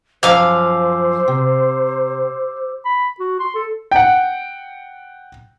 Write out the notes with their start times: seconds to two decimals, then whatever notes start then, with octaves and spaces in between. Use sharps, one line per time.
0.23 F#2 F3 C5 F5 A#5 D6 E6 F6
1.28 C3
2.85 B5
3.19 F#4
3.39 C6
3.55 A4
3.92 F#5 G5